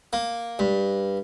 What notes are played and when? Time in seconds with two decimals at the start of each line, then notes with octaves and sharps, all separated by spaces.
0.13 A#3
0.59 G2